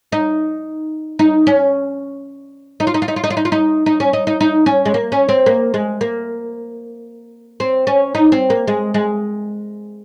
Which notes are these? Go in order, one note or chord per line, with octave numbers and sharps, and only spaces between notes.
D#4
D#4
C#4
D#4
F4
D#4
F4
D#4
F4
D#4
F4
D#4
F4
D#4
D#4
C#4
D#4
D#4
D#4
C#4
G#3
A#3
C#4
C4
A#3
G#3
A#3
C4
C#4
D#4
C4
A#3
G#3
G#3